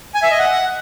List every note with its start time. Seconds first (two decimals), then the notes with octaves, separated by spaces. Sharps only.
0.14 G#5
0.23 E5
0.31 D#5
0.39 F#5